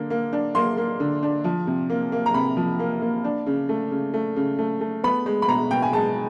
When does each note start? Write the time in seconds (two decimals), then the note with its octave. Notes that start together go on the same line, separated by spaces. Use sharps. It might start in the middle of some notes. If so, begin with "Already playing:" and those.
Already playing: D3 A#3
0.10 A#3
0.33 D4
0.55 A#3 C6
0.77 A#3
1.00 D3
1.23 D4
1.44 F3
1.67 C3
1.90 A#3
2.12 A#3
2.26 A#5
2.34 C3 B5
2.57 F3
2.79 A#3
3.02 A#3
3.24 D4
3.47 C#3
3.69 A3
3.91 C#3
4.14 A3
4.36 C#3
4.59 A3
4.81 A3
5.04 B3 B5
5.26 G#3
5.42 B5
5.48 B2 A#5
5.71 B2 G5
5.82 G#5
5.93 G#3 A5